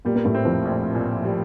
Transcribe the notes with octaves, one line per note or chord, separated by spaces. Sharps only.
A#2 G3 A#3
A#3
A2 A3
C4
F2 F3
A#1
A#2
G3